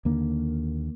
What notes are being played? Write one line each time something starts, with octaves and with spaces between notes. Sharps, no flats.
D#2 D3 A#3